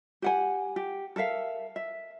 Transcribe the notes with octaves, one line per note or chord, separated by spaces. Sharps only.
G4 F#5 G#5
G4
A4 A#4 E5 F5
E5